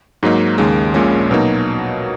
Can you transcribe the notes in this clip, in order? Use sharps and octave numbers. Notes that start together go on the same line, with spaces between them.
G#2 F#3 A#3 D#4
D#2 C#3 G#3
A#1 A#2 G#3 C#4
B2 F#3 A#3 D#4